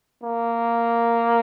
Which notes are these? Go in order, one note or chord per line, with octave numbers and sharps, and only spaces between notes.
A#3